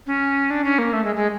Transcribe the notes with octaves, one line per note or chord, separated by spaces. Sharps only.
C#4
D4
C#4
A#3
A3
G#3
G#3